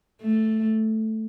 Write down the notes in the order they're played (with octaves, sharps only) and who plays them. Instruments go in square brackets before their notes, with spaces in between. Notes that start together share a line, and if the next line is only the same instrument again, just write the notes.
[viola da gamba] A3